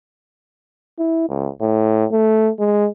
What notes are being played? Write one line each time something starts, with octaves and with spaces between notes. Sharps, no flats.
E4
C#2
A2
A3
G#3